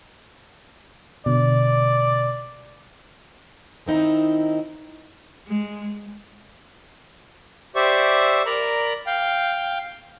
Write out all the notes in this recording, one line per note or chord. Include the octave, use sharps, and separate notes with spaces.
B2 D3 D5
D#3 C4 D#4 E4
G#3
G4 C5 D5 E5 C#6
A#4 D5 A#5 B5
F5 G5